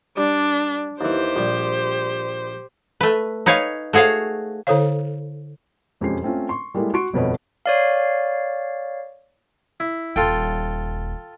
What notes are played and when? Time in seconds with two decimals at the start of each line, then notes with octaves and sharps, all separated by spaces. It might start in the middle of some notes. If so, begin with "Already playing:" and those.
0.17 G3 D4
1.01 D#2 E3 G4 C5
1.36 A#1 G3
3.01 A3 B4
3.46 D#4 B4 C#5 F5 G#5
3.93 A3 F#4 G#4 C#5 F5
4.67 D3 E4 A4 C5 C#5 F5
6.01 E1 F2 G#3 C#4 G4 C7
6.23 A3 C4 C#4 F4
6.49 C6 C#6
6.75 G3 G#3 A#3 E4 A4
6.94 F#4 C6 C#6 D7
7.13 G1 F2 B2 B4 C#5 D#5
7.66 C#5 D5 F5
9.80 E4
10.16 D#1 F4 A4 G5